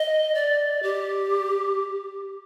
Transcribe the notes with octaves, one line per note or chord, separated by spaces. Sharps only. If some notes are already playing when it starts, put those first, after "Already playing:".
Already playing: D#5
D5
G4